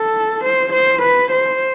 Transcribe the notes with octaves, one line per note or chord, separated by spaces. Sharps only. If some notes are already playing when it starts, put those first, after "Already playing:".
Already playing: A4
C5
C5
B4
C5